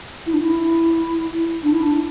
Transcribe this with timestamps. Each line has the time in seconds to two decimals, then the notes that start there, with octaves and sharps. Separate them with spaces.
0.27 E4
0.34 D4
0.41 E4
1.63 D4
1.73 E4
1.82 D4